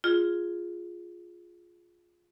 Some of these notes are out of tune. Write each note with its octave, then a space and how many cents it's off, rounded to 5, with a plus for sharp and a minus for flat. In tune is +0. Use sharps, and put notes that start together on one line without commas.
F4 +0 G#4 +0